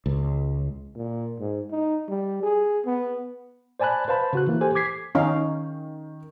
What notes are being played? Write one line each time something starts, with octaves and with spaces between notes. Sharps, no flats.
C#2
A#2
G#2
D#4
G3
G#4
B3
C5 D5 G#5 A5 B5 F#6
B4 C5 F5 A5 B5
C#3 F#4 F#6
E3 A#3
G4 A4 C5 G#5
D6 G#6 B6 C7
D#3 C#4 D#4 F5